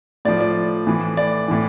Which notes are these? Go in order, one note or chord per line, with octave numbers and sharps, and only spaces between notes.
A2 F3 D5
D5
A2 E3
D5
A2 E3